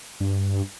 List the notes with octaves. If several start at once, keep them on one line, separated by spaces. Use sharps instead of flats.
G2